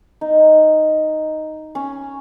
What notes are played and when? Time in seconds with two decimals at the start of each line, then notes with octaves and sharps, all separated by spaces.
0.21 D#4
1.75 C#4